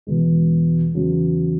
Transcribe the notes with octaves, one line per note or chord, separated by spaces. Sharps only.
E1 E2 B2 G#3
E2 C#3 F#3